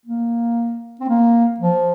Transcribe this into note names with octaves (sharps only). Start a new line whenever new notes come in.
A#3
C4
A#3
F3